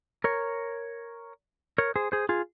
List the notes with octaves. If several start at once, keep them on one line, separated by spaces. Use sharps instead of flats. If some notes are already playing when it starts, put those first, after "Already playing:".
A#4 C#5
A#4 C#5
G#4 C5
G#4 C5
F4 G#4